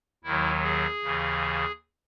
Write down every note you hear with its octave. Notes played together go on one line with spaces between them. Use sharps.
D#2 D#3 F#3 E4
G#4
D#2 C#3 E3